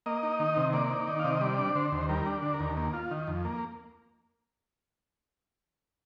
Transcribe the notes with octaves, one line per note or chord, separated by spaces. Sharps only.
A#3 D#5
D#4
D#3
C3
A#3 D5
D#4
D#3
C3 F5
D#5
G3 D5
D4
D3 C5
D#2
G3 A#4
D4
D3
A#4
D#2
A#3
F4
D#3
F2
A#3